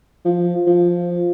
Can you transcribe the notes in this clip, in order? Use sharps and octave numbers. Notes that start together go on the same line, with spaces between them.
F3
F3